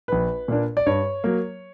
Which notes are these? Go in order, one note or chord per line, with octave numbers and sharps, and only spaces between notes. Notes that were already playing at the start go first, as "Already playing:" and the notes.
A#1 B4
A#2 A#3 D4
D5
G2 C#5
F#3 A#3